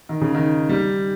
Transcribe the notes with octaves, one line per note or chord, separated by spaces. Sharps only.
D#3
C#3
D#3
G3